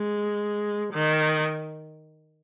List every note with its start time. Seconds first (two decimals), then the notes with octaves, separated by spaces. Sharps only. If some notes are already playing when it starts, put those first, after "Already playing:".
Already playing: G#3
0.93 D#3